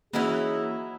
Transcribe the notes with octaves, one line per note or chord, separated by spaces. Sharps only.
E3 F#3 A#3 C#4 D#4 E4 F#4 G#4